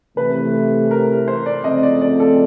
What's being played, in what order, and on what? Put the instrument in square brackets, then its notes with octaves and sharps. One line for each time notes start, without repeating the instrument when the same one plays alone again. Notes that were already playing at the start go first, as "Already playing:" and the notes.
[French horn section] C3 E3 A3 [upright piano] B4
[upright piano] A#4
C5
D5
[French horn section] C#3 F3 A3 C4 [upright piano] D#5
[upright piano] D5
D5
A4